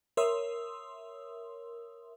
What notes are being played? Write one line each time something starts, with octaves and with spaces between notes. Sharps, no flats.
A#4 C#5 E5 C6 D#6 E6